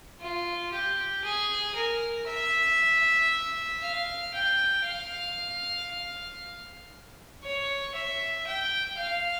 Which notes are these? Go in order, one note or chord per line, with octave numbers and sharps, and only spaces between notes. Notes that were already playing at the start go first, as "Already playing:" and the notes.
F4
G4
G#4
A#4
E5
F5
G5
F5
C#5
E5
G5
F5